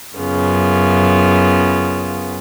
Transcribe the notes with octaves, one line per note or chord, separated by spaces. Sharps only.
F#2 C#3 B3 F4